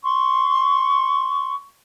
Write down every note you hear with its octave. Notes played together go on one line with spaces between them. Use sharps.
C6 C#6